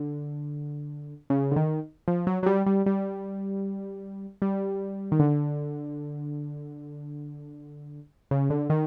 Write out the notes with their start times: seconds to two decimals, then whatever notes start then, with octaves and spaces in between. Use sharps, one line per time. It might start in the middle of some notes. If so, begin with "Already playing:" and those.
Already playing: D3
1.30 C#3
1.51 D3
1.56 D#3
2.08 F3
2.27 F#3
2.43 F#3
2.46 G3
2.66 G3
2.86 G3
4.42 G3
5.12 D#3
5.19 D3
8.31 C#3
8.50 D3
8.70 D#3